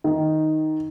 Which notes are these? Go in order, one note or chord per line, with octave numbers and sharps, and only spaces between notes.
D#3